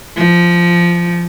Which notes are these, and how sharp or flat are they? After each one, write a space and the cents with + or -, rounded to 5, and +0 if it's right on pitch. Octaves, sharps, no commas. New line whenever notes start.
F3 -10